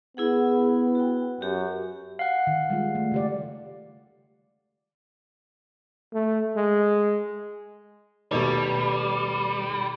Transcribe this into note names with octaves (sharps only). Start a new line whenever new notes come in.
B3 E4 G#4 F#5
F#4 G5
F#2 F#4 G4
F5 F#5
D#3
G3 G#3 F4
A3
C#3 G4 D5
A3
G#3
D#2 B2 G3 A3